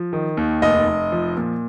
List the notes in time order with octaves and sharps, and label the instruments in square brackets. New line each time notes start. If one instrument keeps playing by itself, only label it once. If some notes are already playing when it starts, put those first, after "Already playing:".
Already playing: [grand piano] F3
D#3
D#2
F1 D#5
F1
F3
A#2